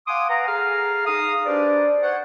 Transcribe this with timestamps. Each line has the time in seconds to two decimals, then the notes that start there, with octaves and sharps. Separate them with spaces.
0.07 F5 F#5 G#5 C6 D6 D#6
0.30 B4 F5 F#5 G#5 A#5
0.48 G#4 A4 F5 A#5 F6
1.07 D#4 G#4 F5 A#5 D#6
1.46 D4 G4 B4 C5 D5
2.03 C5 C#5 F#5